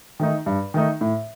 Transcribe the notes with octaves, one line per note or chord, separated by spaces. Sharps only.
D#3 A3 D#4
G2
D#3 A3 D#4
A2